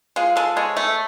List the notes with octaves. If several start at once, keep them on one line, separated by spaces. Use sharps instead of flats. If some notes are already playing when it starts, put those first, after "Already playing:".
G#3 F4
G#3 A4
G#3 C#5
A3 E5